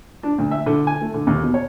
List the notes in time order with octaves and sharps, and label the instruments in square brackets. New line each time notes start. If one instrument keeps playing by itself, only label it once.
[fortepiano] D4
D2
E5
D3
G#5
A3
D3
D#2
B2
C#5